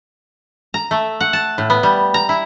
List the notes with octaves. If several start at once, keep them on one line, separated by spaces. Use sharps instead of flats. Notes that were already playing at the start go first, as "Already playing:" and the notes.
A#5
A3
F#5
A5
A2
B3
G3
A#5
E4